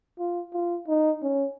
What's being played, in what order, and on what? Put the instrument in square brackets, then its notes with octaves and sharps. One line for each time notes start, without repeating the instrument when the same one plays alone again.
[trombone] F4
F4
D#4
C#4